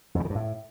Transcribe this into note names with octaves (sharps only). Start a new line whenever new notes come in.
F2
C#3
D#3
G2
A2